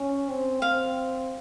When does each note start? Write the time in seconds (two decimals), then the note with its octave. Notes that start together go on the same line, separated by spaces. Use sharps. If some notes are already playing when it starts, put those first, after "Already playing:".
Already playing: C#4
0.29 C4
0.62 C4 F5